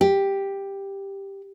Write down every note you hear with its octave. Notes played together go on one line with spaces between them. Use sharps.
G4